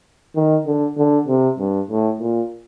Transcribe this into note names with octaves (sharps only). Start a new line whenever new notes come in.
D#3
D3
D3
C3
G2
A2
A#2